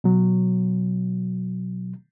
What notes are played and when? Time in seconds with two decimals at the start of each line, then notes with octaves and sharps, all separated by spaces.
0.04 B2 F#3